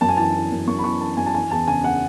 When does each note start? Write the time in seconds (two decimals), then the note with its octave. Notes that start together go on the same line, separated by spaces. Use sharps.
0.01 F#2 A5
0.09 G#5
0.17 E3 A5
0.35 E3
0.52 F#2
0.68 F#2 C#6
0.79 B5
0.84 E3 C#6
1.01 E3 A5
1.17 F#2 G#5
1.26 A5
1.34 E3 G#5
1.51 E2 A5
1.67 C#3 G#5
1.84 F#5